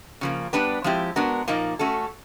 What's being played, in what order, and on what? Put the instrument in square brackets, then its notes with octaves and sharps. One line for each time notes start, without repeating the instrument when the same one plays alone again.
[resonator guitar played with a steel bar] C#3 F3 A#3
G3 B3 D4 G4 B4
F3 G#3 C4 E4 G4
G#3 B3 D4 F#4 A#4
A#2 F3 A#3 D#4
A3 C#4 F#4 A4